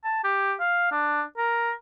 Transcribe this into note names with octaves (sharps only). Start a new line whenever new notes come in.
A5
G4
F5
D4
A#4